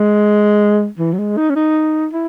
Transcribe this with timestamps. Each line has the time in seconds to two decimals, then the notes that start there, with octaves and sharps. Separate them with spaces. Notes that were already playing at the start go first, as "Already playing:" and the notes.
Already playing: G#3
0.99 E3
1.14 F#3
1.18 G#3
1.37 D#4
1.50 C#4
1.56 D#4
2.13 E4